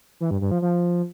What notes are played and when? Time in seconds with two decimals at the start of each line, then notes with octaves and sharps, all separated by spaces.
0.20 E3
0.31 G2
0.41 G2
0.51 F3
0.62 F3